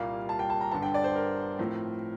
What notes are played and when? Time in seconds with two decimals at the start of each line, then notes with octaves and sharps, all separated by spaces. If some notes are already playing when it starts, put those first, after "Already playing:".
Already playing: C2 A#2 G3 A#3 F5
0.29 A5
0.39 G5
0.50 A5
0.61 A#5
0.71 G1 G2 D3 A5
0.82 G5
0.94 D5
1.04 C5
1.15 A#4
1.59 A2 F3 C4